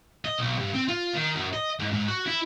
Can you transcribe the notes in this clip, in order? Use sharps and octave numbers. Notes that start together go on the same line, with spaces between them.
D#5
B1
G2
C4
F4
D#3
F#2
D#5
G#2
G#2
F#4
E4